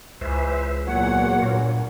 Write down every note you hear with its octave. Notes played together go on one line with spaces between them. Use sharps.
C#2 E3 B4 C5 E5
E2 A#2 F#3 A#3 C#5 F#5
G2 A#2